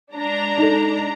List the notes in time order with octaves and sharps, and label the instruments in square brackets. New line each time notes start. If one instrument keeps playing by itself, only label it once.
[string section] G#3 D4 A#5
[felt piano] D#4 A4